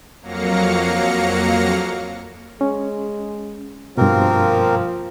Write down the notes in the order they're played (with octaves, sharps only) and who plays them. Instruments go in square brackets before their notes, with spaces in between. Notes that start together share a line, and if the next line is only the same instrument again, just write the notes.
[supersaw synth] F2 F#3 A#3 F5 A#6 C#7
[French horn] G#3 [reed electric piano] C#4
[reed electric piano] G2 B2 [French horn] F3 [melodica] A#3 C4 A#4